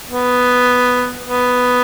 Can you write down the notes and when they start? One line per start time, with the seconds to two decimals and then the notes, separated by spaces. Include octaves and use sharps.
0.09 B3
1.25 B3